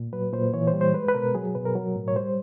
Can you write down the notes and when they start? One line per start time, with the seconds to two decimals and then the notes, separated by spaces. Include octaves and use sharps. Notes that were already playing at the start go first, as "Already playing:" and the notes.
Already playing: A#2
0.13 F#3 B4
0.33 A#2 C5
0.54 E3 C#5
0.68 C5
0.74 G3
0.81 C5
0.94 G#3 B4
1.09 B4
1.15 B2 A#4
1.35 F#3 G#4
1.55 B2 B4
1.66 A#4
1.75 F#3
1.96 A2
2.08 C#5
2.16 G3 C5